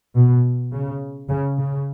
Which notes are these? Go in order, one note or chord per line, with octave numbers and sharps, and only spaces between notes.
B2
C#3
C#3
C#3